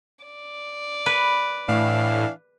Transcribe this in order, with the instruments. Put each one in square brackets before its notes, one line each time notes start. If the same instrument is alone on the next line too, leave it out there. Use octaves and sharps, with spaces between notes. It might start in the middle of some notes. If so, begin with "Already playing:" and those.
[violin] D5
[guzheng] B4
[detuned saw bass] A2 [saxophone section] E3 D4 F5